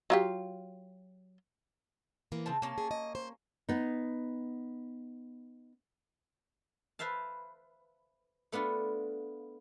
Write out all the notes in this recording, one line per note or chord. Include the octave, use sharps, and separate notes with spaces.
F#3 F4 G4
E3 A#3
C#3 C4 A5
C3 A#3 C#4 A5
G#4
D#5
C5
B3 D#4
B4 C5 E5 F5 A5
A3 B3 D4 F4